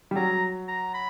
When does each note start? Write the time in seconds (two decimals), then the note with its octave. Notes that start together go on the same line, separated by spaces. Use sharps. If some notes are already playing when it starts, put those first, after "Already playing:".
0.11 G3
0.16 F#3 A#5
0.68 A#5
0.94 B5